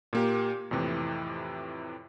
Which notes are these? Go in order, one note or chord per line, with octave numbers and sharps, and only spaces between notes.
A#2 A#3 G4
F2 A2 C3 E3